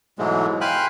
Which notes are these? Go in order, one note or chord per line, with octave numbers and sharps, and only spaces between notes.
G#2 B2 E3 F#3 G#3 A3
F5 G5 G#5 B5 C6 F#6